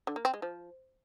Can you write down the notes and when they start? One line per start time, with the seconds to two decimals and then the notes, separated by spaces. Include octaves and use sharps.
0.07 D3
0.16 A#3
0.25 C4
0.34 G#3
0.42 F3